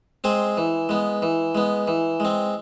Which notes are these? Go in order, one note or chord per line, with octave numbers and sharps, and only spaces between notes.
G#3 C4 G#4 C5
E3
G#3 B3
E3
G#3 B3
E3
G#3 C4